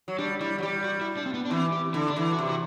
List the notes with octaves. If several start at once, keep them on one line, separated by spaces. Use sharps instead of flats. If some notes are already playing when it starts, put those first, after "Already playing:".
F#3
G3 D4
G3 E4
F#3
G3 G4
F#4
E4
D4
C4
B3
D4
E3 C4
G4
D3 E4
D4
E3 E4
F#4
C3
F#4